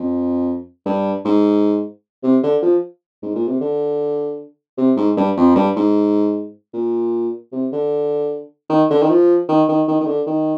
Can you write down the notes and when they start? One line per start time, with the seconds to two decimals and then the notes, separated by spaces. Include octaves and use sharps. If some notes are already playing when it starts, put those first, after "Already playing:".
Already playing: F2
0.85 G2
1.25 G#2
2.23 C3
2.43 D3
2.62 F3
3.23 G#2
3.35 A#2
3.48 C3
3.61 D3
4.78 C3
4.97 G#2
5.17 G2
5.37 F2
5.56 G2
5.76 G#2
6.74 A#2
7.52 C3
7.72 D3
8.70 D#3
8.90 D3
9.02 D#3
9.09 F3
9.49 D#3
9.68 D#3
9.88 D#3
10.00 D#3
10.07 D3
10.26 D#3